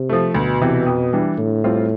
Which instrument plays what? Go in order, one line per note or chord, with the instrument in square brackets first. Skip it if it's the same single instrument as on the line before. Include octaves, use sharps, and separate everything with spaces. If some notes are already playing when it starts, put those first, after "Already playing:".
Already playing: [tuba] C3
[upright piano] F3 A3
[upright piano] D2 [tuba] B2
[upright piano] C3 E3
F2
E3 G3 D4
[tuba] A2 [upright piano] D3
[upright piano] G3 C4 F4